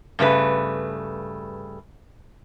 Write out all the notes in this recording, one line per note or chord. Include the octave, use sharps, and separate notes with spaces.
G2 C#3 A3 B4